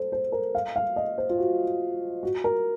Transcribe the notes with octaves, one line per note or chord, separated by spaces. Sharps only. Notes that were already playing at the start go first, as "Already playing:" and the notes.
Already playing: A4 C5
C5
A#4
F5
F5
D#5
C5
F4
F#4
F#4
A#4